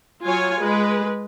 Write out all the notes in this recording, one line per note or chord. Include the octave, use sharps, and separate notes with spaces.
F#3 F4 C#5 G#5
G#3 B4